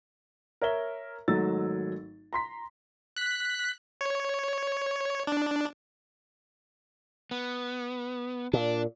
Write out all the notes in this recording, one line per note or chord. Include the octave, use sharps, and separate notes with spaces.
A#4 C#5 E5 G7
G#1 G#2 F#3 A3 E6 A6
A#5 C6 B6
F#6 B6
C#5
D4
B3
A#2 D4